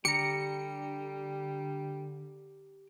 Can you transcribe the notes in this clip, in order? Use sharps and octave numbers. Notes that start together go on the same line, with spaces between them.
D3 G3 G4 A#5 C#7